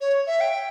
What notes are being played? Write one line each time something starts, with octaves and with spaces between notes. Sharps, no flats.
C#5
E5
G5